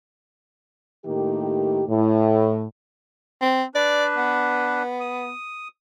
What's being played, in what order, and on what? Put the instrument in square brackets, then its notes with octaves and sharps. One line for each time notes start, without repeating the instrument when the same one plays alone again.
[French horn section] A2 D#3 A#3 G4
A2
[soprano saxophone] C4
[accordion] D4 B4 [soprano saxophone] D5
[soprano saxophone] B3
[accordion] D#6